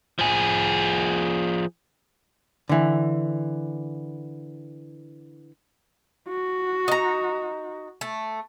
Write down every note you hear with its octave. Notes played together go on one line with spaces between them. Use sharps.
F3 G#4
D3 E3
F#4
D#4 A#5
A3